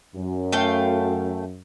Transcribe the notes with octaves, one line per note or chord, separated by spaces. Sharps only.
F#2
A3 F5 G5